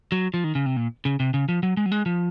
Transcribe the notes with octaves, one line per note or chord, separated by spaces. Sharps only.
F#3
F3
D#3
C#3
C3
A#2
C#3
C3
C#3
F3
F#3
G#3
F#3
G#3
F3